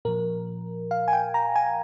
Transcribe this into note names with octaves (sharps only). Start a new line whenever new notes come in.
A#2 F3 A#4
F5
G#5
G5
A#5
G#5